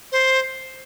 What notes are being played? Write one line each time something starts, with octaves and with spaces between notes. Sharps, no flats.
C5